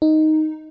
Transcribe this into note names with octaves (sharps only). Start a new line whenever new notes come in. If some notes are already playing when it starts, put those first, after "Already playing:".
D#4